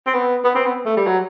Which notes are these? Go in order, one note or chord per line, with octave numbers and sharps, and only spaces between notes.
C4
B3
B3
C4
B3
A3
G3
F#3